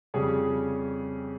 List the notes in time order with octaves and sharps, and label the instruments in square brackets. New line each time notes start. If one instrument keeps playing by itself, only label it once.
[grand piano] F2 C#3 G3 C#4 G#4